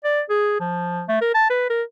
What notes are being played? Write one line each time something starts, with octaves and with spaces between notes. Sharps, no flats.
D5
G#4
F3
A3
A#4
A5
B4
A#4